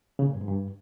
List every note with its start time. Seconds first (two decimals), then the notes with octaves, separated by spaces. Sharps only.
0.19 C#3
0.26 A#2
0.34 G2
0.41 G#2
0.49 G2